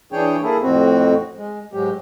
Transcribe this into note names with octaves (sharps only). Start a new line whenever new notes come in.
E3 D4 G#4 C#5 G5
A#3 E4 G#4 A4
F2 A2 C4 F#4
G#3
G#2 F#3 G#3 G4